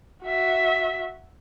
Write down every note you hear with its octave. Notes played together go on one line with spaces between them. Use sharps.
F#4 E5